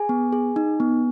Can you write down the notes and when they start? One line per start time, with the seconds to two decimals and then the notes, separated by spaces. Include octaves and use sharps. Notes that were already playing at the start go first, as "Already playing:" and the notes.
Already playing: G#4 G#5
0.09 B3
0.33 G#4
0.56 D#4
0.80 B3